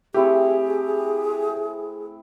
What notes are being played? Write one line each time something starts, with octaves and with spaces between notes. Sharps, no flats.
A3 C4 E4 G4 G#4